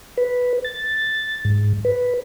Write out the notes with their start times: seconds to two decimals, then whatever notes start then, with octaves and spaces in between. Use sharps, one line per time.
0.18 B4
0.64 A6
1.45 G#2
1.85 B4